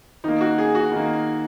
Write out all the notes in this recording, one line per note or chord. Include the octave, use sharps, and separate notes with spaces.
D#3 A#3 D#4
F#4
G#4
F#4
D#3 A#3